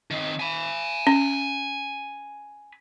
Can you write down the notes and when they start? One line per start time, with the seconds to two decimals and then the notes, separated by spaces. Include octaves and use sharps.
0.11 D#3 C4
0.40 G#5 B5
1.07 C#4